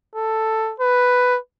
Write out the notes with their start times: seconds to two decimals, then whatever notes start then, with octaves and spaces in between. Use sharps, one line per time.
0.16 A4
0.80 B4